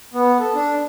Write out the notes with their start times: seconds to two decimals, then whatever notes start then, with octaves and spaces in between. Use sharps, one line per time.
0.14 B3
0.39 A4
0.55 D4